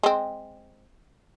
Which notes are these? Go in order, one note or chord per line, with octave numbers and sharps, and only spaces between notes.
G#3 C4